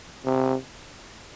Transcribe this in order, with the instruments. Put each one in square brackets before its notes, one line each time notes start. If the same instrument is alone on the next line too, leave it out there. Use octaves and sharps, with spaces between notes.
[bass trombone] C3